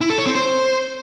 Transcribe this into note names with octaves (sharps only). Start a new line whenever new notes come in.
E4
A4
C#5
C4
C5